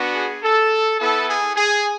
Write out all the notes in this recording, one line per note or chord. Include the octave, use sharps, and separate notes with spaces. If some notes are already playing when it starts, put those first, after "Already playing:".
Already playing: B3 D4 F#4
G#4
A4
B3 E4 A4
G#4
G#4